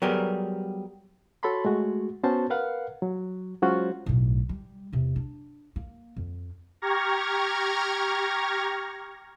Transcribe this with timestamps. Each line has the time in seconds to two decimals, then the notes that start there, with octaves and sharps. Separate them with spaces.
0.02 F#3 G3 B3 G4 G#4 A#4
1.43 F#4 A4 C#5 A5 B5 C6
1.65 G#3 A3 F#4
2.23 B3 C#4 F#4 C5 A5
2.50 A#4 B4 F5 F#5
3.02 F#3
3.62 F#3 G#3 C#4 F4 F#4 C5
4.06 B1 A2
4.49 G3
4.93 E2 C3
5.16 D4
5.76 A#3
6.16 F2
6.82 G4 A#5 C#6 F6 G#6 A#6